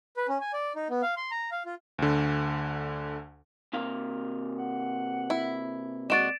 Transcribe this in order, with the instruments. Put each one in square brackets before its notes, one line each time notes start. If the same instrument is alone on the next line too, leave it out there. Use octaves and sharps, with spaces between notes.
[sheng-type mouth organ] B4
C#4
G#5
D5
D#4
B3
F5
C6
A#5
F5
F4
[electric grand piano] D2 D3
[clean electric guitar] C3 A#3 F5
[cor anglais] F#5
[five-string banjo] E4
[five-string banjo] G#3 F#4 [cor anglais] D5 [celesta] A6 D7 E7